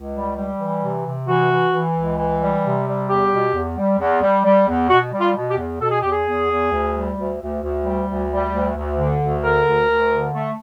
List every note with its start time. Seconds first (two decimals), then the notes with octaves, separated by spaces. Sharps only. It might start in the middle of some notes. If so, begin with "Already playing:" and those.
Already playing: C#2
0.15 G3
0.36 G3
0.60 E3
0.82 C3
1.05 C3
1.27 E3 F#4
1.50 E3
1.72 E3
1.95 C#2
2.17 E3
2.41 G3
2.63 C3
2.86 G3
3.09 E2 G4
3.32 B2
3.53 E2
3.77 G3
3.99 E2
4.22 G3
4.45 G3
4.68 E2
4.90 B2 F#4
5.12 G3
5.20 F4
5.35 B2
5.51 G4
5.58 E2
5.80 B2 A4
5.91 G#4
6.01 E2 G4
6.12 G#4
6.26 E2
6.49 E2
6.71 D2
6.94 G3
7.16 D2
7.40 D2
7.62 D2
7.85 G3
8.08 D2
8.30 G3
8.52 D2
8.75 D2
8.98 D3
9.20 D2
9.43 D3 A#4
9.66 D2
9.89 D2
10.11 D3
10.34 A3